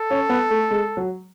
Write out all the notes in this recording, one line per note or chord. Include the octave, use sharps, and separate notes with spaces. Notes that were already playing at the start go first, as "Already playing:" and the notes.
Already playing: A4
C#4
B3
A3
G#3
F#3